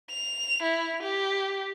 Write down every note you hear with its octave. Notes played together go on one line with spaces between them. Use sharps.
F7
E4
G4